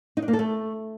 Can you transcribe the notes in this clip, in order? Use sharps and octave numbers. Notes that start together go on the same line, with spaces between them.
D#4
D4
A#3
A4
A3